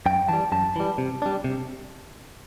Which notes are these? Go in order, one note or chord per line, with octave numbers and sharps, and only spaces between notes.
F#2 G5
E3 G3 A5
F#2 A5
E3 G3
C3
G3 D4
C3